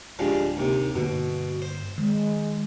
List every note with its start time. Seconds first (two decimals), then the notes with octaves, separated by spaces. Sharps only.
0.19 D1 F3 G3 G#3 D4
0.57 D#2 C3
0.95 G2 B2 D3 A#3
1.62 C5
1.98 D#3 G#3